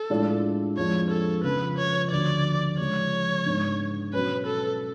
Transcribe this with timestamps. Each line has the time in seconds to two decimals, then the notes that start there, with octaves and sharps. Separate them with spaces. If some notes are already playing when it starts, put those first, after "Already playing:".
Already playing: A4
0.10 A2 G#3 D4 F4
0.77 F2 F3 G#3 D4 F4 C#5
1.11 A4
1.44 C#3 F3 B3 F4 B4
1.78 C#5
2.11 D2 D3 F3 D5
2.79 C#3 F3 G#3 C#4 C#5
3.46 G#2 G#3 B3 D4
4.13 B2 F#3 C#4 B4
4.46 A4